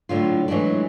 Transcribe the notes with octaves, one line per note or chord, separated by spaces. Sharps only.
A2 D3 F#3 F4
E3 F#3 G#3 A3 D4